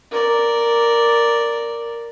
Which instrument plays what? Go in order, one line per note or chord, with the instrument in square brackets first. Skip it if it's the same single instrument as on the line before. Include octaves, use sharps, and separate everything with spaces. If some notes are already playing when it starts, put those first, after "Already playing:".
[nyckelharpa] A#4 D5